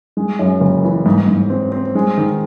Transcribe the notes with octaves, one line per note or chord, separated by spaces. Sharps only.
G#3
F#2
F#1
E3
G#2
G#2
C4
C4
G#3
D#3